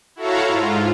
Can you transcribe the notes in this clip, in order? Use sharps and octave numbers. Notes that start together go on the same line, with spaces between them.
E4 F#4 A4 C#5 F5 A#5
G#2 F4